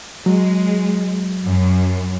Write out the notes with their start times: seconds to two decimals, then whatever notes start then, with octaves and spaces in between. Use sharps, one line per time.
0.26 F#3 G#3
1.45 F#2